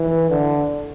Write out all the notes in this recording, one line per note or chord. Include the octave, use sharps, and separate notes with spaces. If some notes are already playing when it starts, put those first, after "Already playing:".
Already playing: E3
D3